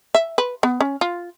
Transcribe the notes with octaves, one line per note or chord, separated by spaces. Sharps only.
E5
B4
B3
C#4
F4